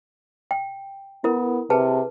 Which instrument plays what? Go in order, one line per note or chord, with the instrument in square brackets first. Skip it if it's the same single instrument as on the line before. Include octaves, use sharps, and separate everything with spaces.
[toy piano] G5
[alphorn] B3 [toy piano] E4 A#4
[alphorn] C3 [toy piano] G#4 B4 A5